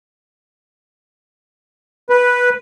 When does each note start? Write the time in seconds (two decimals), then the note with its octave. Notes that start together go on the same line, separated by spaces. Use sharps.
2.10 B4